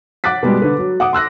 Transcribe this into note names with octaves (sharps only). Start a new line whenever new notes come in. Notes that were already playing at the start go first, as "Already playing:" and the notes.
F#5 D6 F#6 A6 B6
B2 G3 G#3
D3 B4
F#3
F#5 D6 D#6
C6 E6 F#6 A#6